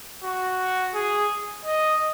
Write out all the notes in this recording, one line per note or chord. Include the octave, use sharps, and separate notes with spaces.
F#4
G#4
D#5